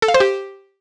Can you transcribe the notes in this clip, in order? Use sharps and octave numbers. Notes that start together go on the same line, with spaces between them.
A4
F5
C5
G4